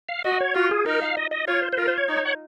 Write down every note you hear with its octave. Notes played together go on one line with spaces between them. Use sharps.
F5
F#4 D#5
C#5
F4 F#4
G#4
D#4 A#4
F5
D#5
D#5
F4 C#5
C5
C5
F4 A#4
C5
C#5
D#4
F#5